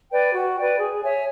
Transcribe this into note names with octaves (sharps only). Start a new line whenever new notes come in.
B4 D5 G5
F#4
B4 D5 G5
G#4
C#5 E5 G#5